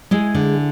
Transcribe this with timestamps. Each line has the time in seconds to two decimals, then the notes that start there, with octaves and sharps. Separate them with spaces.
0.11 G#3 E4 G#4
0.35 D3